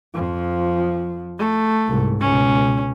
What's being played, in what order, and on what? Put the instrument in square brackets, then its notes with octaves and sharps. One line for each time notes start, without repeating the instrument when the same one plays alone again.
[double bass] F2 F3
[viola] A3
[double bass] C2 G#2
[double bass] C#2 B2 [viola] C#4